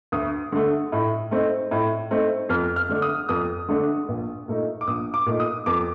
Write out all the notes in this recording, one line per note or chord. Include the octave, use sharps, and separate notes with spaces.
D2 D#6
D3 A3
A2
A3 C4 D#4
A2
A3 C4 D#4
F2 F6
F6
D3 A3 D4
D#6
F2 D#6
D3 A3 D4
A#1
A#2 A3 D#4
D6
A#1 D#6
D6
A#2 A3 D#4
D#6
F2 D6